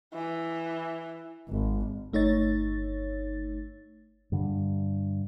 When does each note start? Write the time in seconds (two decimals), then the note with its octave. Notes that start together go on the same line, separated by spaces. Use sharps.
0.13 E3
1.49 G#1
2.13 G1 A3 D#4 C#5 A6
4.32 G2 D3